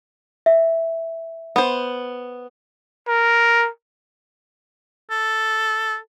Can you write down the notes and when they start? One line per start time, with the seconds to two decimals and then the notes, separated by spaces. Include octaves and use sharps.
0.46 E5
1.56 B3 C5
3.07 A#4
5.10 A4